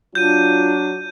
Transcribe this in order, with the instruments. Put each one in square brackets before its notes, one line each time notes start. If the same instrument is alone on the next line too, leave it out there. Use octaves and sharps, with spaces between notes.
[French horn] F#3 [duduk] D4 [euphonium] F4 [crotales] G6 D#7